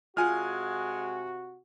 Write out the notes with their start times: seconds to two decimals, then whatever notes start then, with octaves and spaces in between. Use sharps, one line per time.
0.17 C3 G#3 F4 F#4 F#5 G#5 F6